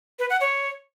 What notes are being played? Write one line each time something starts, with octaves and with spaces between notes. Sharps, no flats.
B4
F#5
C#5